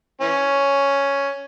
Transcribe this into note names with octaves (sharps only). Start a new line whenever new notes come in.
E3 C#4